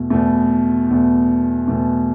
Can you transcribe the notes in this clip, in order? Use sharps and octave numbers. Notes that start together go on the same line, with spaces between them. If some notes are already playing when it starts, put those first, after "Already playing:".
Already playing: E2 B2 A3
E2 B2 A3
E2 B2 A3
E2 B2 A3